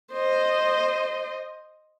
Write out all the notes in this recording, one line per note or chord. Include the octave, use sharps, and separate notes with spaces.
C5 D#5